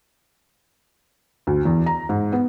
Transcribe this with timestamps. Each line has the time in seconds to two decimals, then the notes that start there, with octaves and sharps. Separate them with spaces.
1.47 D2
1.65 E2
1.86 A#5
2.09 G#2
2.32 B3